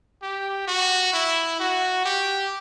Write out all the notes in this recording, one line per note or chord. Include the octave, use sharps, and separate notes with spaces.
G4
F#4
E4
F#4
G4